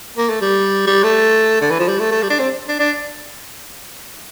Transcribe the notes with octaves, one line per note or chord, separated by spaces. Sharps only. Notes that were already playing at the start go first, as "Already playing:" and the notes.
A#3
A3
G3
G3
A3
D3
E3
F3
G3
A3
A3
G3
D4
C4
D4
D4